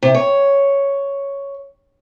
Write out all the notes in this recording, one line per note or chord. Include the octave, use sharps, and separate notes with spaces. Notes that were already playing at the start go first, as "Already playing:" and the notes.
C3
C#5